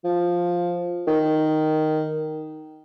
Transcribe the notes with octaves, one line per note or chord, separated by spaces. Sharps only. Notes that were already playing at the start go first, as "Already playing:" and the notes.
F3
D#3